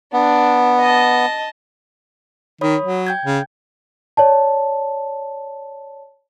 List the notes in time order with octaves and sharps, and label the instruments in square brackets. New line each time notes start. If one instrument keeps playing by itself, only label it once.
[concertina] B3 [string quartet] D4
[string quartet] D#5 A5
[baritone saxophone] D#3 [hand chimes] C#5 B5 D#6
[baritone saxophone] F#3
[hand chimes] G5 G6 G#6
[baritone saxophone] C#3
[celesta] C#5 D5 A5